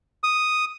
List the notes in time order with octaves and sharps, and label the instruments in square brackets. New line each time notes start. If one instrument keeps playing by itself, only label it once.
[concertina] D#6